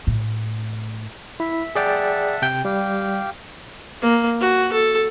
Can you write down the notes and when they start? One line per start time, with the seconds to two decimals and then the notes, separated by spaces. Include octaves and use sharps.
0.07 A2
1.40 E4 E5
1.75 G#4 D5 E5 F#5 G5 A5
2.42 C3 G5 G6
2.65 G3 G4 F5 G5
4.02 A#3
4.41 F#4
4.73 A4